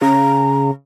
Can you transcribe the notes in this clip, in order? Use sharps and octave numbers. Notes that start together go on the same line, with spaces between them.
C#3 A#5